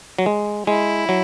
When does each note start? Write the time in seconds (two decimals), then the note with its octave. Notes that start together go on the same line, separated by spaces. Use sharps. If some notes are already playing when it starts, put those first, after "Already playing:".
0.19 F#3
0.26 G#3
0.67 G#3 E4
1.09 F#3